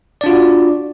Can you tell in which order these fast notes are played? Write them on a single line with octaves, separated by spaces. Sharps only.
D5 D4 F4 F#4